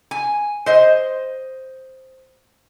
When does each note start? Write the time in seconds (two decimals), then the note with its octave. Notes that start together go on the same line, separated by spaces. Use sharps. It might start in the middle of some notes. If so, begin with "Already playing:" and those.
0.11 G#5
0.66 C5 D#5